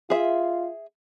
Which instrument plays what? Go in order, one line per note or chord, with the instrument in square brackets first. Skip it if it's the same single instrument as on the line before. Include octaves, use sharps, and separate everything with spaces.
[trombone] F4 [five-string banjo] G#4 E5